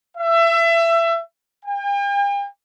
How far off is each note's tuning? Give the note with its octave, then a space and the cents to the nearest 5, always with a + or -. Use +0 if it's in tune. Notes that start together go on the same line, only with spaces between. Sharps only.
E5 +25
G5 +45